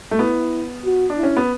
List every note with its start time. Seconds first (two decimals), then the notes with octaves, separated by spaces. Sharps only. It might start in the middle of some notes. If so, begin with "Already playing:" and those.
0.11 A3
0.19 B3 E4
0.85 F#4
1.10 D4
1.17 E4
1.23 C#4
1.37 B3